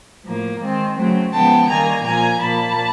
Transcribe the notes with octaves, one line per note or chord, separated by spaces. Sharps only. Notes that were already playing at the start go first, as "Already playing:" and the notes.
A2 F3 A#3
D#3 G#3 C4
C#3 F#3 A3 C4
C#3 F3 G#3 B3 G5 A5
D#3 G3 A#3 G#5 A#5
A#2 F3 A#3 G#5 A#5
A#2 F3 A#3 A5 B5